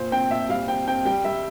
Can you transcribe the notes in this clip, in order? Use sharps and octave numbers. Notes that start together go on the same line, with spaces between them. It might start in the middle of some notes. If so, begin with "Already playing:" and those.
Already playing: A#2 C5
C4 G5
A#2 E5
G3 F5
C4 G5
C4 G5
G3 G5
G3 E5